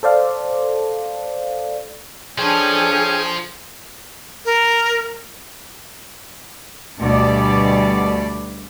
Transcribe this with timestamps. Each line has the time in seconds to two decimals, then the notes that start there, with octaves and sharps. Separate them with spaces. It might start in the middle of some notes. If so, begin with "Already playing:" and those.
0.03 A4 C5 D5 F5
2.38 F3 C#4 D4 G#4 A4 G5 G#5
4.45 A#4
6.99 D2 B2 G3 D5